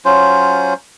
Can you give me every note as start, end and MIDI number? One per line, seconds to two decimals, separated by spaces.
0.05 0.74 54
0.05 0.74 61
0.05 0.74 65
0.05 0.74 72